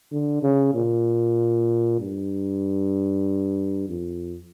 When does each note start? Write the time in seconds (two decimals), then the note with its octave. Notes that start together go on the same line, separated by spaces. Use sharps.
0.12 D3
0.43 C#3
0.75 A#2
2.00 G2
3.89 F2